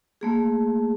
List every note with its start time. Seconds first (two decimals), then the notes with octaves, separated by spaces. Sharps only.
0.21 A3 A#3 G#4